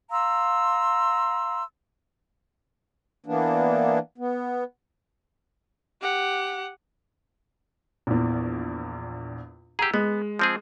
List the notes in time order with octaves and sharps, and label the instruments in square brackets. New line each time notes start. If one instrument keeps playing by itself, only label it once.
[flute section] F5 A#5 C6 E6
[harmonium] E3 A#3 B3 D4
B3
[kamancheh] G4 F#5
[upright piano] A#1 E2
[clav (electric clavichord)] G4 G#4 [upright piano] A#5 E6
[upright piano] G#3 [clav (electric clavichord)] B3
[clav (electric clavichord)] F3 C4 G#4